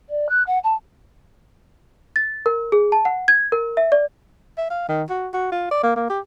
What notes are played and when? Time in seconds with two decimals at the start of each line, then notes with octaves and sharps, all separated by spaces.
0.09 D5
0.29 F#6
0.47 F#5
0.64 A5
2.16 A6
2.46 A#4
2.72 G#4
2.92 A5
3.05 F#5
3.28 G#6
3.52 A#4
3.77 E5
3.92 D5
4.58 E5
4.70 F5
4.89 D#3
5.10 F#4
5.33 F#4
5.52 F4
5.71 D5
5.83 A#3
5.96 A#3
6.10 G4